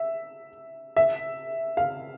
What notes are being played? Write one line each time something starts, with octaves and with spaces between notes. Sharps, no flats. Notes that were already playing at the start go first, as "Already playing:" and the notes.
Already playing: E5
E5
F5